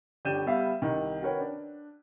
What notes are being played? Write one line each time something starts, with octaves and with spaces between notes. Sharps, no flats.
G1 D4 G4 G6 D#7 E7
G3 B3 E5 F5
C2 D#3
F#4 A#4 B4 C#5 G5
D4